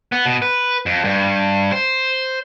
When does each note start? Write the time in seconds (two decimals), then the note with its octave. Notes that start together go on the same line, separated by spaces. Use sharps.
0.12 B3
0.26 B2
0.42 B4
0.86 F2
1.05 G2
1.72 C5